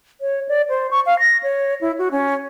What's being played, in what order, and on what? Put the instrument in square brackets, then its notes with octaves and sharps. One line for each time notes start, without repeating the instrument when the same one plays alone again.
[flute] C#5
D5
C5
C#6
F5
A#6
C#5
E4
F#4
C#4